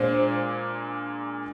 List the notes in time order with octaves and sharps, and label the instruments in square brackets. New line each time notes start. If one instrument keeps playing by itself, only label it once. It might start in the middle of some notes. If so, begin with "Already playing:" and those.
Already playing: [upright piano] A#2 G#3 D4 G#4 [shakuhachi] C5